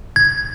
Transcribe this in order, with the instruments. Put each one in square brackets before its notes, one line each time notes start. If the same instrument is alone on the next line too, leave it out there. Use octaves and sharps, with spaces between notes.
[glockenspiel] G#6